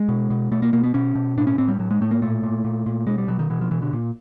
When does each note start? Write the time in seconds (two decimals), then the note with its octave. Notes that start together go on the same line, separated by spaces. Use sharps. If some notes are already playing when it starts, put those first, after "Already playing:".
Already playing: G#3
0.09 B2
0.30 B2
0.51 B2 A3
0.62 A#3
0.73 B2 A#3
0.84 B3
0.94 B2 C#4
1.15 B2
1.37 A2 D4
1.47 C#4
1.58 A2 C4
1.68 G3
1.79 A2 F#3
1.91 G#3
2.01 A2 A3
2.11 A#3
2.22 A#2 A3
2.44 A#2
2.65 A#2
2.86 A#2
3.07 B2 G#3
3.18 G3
3.28 B2 F#3
3.39 D#3
3.50 B2 E3
3.61 F3
3.71 B2 E3
3.82 D3
3.93 A#2